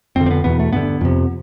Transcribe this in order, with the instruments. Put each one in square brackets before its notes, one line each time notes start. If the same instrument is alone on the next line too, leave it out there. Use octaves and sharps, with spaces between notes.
[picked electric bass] F2 D3 C4
C4
B3
E2 B2 B3
A3
G2 D3 B3
F2 C3